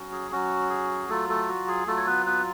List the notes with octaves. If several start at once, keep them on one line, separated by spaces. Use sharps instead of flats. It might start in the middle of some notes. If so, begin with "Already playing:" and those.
Already playing: F#3 C#4 F#4
G#4
F#3 C#4 F#4
G#4
F#3 A3 F4 A4
A3 A4
F#4
G#4
F#3 A3 F4 A4
C#5
B3 B4
B3 B4